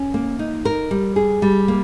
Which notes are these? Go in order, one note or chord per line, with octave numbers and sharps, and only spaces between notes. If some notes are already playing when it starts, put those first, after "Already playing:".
Already playing: C#4
A#3
D#4
A#4
G3
G#4
G3
A#3